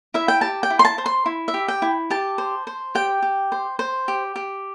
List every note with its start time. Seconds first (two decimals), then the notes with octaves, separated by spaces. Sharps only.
0.14 E4 E5
0.28 G5
0.41 G4 A5
0.63 G5
0.70 E4
0.79 C6
0.85 A5
0.98 C5
1.06 C6
1.26 E4
1.48 E5
1.54 G4
1.68 G5
1.82 E4
2.10 G4 A5
2.38 C5
2.67 C5
2.95 G4 G5
3.22 G4
3.52 C5
3.79 C5
4.08 G4
4.36 G4